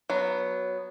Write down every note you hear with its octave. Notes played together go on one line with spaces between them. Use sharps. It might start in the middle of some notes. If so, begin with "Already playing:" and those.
F#3 B3